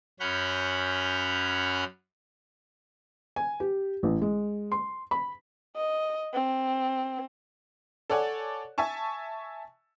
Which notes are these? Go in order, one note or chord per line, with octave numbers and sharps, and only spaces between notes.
F#2 C#4 F#5 B5 F6 G6
G#5
G4
A1
G#3
C6
B5
D#5
C4
A4 C#5 D5 F#5 G#5
E5 G#5 A5 C#6